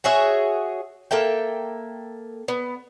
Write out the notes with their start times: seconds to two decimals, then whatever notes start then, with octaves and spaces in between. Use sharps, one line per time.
0.04 F#4 G#4 C#5 E5
1.11 A#3 A4 E5 G5
2.48 B3